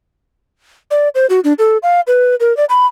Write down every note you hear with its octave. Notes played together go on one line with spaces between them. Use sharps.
D5
C5
F#4
D4
A4
F5
B4
A#4
D5
B5